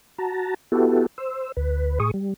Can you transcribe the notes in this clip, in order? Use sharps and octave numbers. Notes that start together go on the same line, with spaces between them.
F#4 A5 A#5
B3 E4 F#4 G4 A4
C5 E6
D2 B4
A2 G#4 C#6 D#6
G3